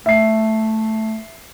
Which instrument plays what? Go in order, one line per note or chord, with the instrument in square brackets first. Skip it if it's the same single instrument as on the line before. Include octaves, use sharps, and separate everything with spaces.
[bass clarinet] A3 [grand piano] E5 C7